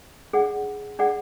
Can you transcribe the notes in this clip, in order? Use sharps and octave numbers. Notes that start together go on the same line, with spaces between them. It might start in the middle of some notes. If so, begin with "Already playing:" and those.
D4 G#4 D5 F#5
D4 G#4 D5 F#5